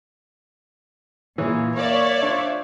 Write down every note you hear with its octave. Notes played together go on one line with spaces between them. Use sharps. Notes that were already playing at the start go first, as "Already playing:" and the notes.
A#2 E3 G#4 C#5
A#3 C#5 D5 E5
D4 F4 C5